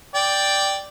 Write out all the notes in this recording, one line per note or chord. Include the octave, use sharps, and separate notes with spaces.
D5 G5